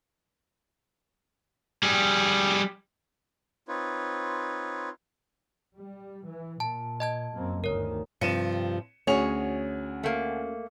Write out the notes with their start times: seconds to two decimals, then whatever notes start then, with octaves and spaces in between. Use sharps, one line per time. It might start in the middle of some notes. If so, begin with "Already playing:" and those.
1.83 G3 G#4
3.68 C4 D#4 F4 B4 C#5
5.75 G3
6.26 E3
6.60 A#2 A5
7.00 D#5 A5 G#6
7.33 F#2 A#3 C4
7.64 G1 D2 D#3 A#4 C#5
8.21 G2 C3 F3 C#7 D#7 E7
9.07 D2 C#4 F#4 G#4 C#5 F7
10.04 A3 A#3